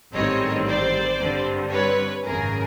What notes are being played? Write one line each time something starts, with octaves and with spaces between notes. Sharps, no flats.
A1 G#2 D#3 G3 C4 C#5 D#5
C5 D5
G2 D3 G3 C4
B4 C#5
G#1 F#2 C#3 G#4 A#4